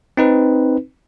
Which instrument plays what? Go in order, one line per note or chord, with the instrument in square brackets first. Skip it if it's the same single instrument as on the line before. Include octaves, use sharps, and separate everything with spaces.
[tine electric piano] C4 D#4 B4